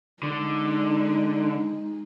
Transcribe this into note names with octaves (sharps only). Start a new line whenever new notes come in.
D3 G#3 D#4